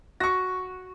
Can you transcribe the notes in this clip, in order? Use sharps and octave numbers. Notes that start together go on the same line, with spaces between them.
F#4 C#6 A#6